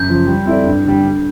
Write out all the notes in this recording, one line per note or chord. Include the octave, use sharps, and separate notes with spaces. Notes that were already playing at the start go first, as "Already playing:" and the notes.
Already playing: F#2 G6
C#3 F3
G3
C4 E4 A4 D5
G2
D3 G3
D3